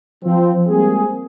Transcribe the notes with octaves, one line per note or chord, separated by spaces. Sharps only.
F3 C4
G3 G#3 A#3 C4 G#4